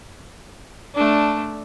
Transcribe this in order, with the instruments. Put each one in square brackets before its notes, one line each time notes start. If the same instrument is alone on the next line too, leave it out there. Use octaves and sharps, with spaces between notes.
[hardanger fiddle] A3 D4